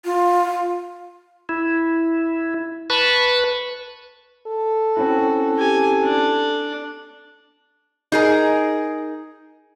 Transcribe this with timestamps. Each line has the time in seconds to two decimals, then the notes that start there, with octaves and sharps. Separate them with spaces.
0.05 F4
1.49 E4
2.90 B4 A5 B5 C#6
4.47 A4
4.97 C4 C#4 E4 F#4
5.56 G4 G#5
6.04 D4
8.12 D#4 G#4 A#4